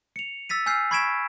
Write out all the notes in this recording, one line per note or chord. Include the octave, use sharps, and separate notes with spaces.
C#7 F7
E6 A6 B6 D#7
G#5 E6 F6 G6 C7
B5 C#6 G#6 B6 D7 E7